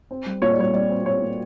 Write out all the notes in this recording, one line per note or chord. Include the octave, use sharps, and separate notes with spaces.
C4
G3
A#2 C#5
D5
G3 C#5
G3 D5
C4
G3 C#5
A#2